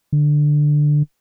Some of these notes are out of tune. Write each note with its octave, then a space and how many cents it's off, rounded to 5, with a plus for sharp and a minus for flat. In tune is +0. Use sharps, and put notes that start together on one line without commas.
D3 +10